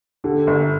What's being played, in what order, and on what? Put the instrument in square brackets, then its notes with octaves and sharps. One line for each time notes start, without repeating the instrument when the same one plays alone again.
[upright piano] D3 [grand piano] G4 A4
[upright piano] G1